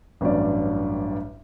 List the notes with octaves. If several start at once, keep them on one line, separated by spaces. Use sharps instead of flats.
A1 G2 F#3 D5